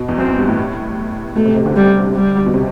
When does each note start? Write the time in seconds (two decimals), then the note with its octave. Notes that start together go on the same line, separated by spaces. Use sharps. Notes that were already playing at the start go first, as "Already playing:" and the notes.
Already playing: B2
0.08 E2
0.18 F#2 C4
0.38 G2
0.48 A2
1.36 B2 A3
1.45 C3
1.56 C3
1.66 D3
1.76 G3
2.15 G3
2.46 B2
2.54 C3